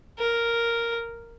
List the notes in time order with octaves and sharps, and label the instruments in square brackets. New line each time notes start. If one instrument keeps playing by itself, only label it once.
[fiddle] A#4